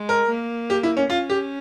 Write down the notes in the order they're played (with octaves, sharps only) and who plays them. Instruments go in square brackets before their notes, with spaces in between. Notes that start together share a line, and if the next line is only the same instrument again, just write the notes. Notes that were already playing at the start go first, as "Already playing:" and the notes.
Already playing: [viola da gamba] G#3
[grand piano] A#4
[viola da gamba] A#3
[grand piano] G4
E4
C#4
[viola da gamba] C#4 [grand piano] F4
[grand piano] G4